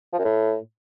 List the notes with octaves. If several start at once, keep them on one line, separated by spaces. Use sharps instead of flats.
F3
F#2
A2